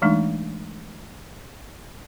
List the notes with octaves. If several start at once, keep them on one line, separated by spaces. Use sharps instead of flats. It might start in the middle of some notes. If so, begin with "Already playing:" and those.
E3 G#3 A3 D4 D#4